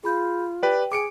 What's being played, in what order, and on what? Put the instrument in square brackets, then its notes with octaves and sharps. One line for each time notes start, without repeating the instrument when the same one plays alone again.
[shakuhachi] F4 [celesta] G#4 B5 G6
[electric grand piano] G4 B4 D5 [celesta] G5
[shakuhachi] G#4 [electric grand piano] D6 C#7 D7